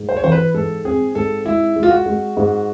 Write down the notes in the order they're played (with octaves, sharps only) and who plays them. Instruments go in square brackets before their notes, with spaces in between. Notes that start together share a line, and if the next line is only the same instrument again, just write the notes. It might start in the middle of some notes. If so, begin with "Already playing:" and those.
Already playing: [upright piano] G#2
[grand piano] C5
C#5
[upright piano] E3 [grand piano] C5
[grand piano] B4
[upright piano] G#2 [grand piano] A4
[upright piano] C4 [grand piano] G#4
[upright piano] G#2 [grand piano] A4
[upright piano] G#3 [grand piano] E4
[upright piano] G#3
[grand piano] F4
F#4
[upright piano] G#3
G#2